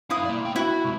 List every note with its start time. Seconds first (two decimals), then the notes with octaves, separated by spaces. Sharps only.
0.10 F#2 E4 F5 D#6
0.25 A#3 D5
0.41 A#3 G5
0.56 E4 F#4
0.84 C3 G#3